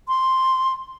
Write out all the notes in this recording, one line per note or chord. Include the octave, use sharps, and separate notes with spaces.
C6